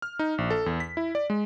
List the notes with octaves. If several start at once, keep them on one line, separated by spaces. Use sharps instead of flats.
F6
D#4
A#1
A4
E2
B6
E4
D5
G#3